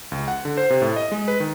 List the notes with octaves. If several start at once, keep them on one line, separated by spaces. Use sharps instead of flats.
C#2
F#5
D3
C5
C3
A2
D#5
G#3
B4
D#3